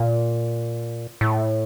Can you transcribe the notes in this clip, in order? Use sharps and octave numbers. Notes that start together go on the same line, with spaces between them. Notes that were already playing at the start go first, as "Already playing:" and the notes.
Already playing: A#2
A2